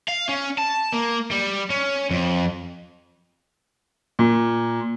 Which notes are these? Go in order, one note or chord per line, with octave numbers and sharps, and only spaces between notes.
F5
C#4
A5
A#3
G3
C#4
F2
A#2